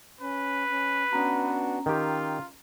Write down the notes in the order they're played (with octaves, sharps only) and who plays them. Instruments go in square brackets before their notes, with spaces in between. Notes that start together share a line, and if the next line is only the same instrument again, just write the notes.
[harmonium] C#4 [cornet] B4
[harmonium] C#4
[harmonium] B3 D4 F#4 [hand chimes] C#4 A#5
[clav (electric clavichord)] D#3 G4 [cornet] F4 [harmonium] G5